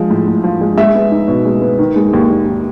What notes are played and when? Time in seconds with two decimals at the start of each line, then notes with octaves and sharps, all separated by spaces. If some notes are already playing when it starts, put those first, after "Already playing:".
Already playing: F3 G#3
0.11 A2
0.27 A2
0.44 F3
0.61 G#3
0.78 G#3 E5
0.95 B3
1.11 D#4
1.28 B2
1.45 G#3
1.62 B3
1.78 D#3
1.96 G#3
2.13 D#2
2.30 D#2
2.46 D#3